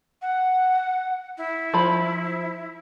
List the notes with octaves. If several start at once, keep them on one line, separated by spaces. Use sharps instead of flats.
F#5
E4
F3 B5